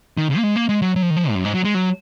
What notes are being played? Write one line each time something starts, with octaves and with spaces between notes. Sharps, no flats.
D#3
C#3
A#3
G#3
A#3
G#3
F#3
F#3
F3
D#3
F3
G#2
F#2
G#2
F#3
G#3
F#3